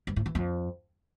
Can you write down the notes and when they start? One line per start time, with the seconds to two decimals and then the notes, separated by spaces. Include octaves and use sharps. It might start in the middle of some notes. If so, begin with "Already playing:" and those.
0.07 G2
0.16 A2
0.26 E3
0.35 F2